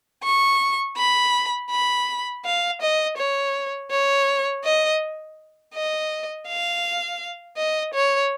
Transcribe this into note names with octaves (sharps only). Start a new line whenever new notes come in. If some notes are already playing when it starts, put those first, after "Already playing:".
C#6
B5
B5
F5
D#5
C#5
C#5
D#5
D#5
F5
D#5
C#5